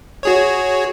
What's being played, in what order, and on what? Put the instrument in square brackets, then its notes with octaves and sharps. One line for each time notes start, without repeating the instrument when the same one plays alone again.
[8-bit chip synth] F#4 G#4 C#5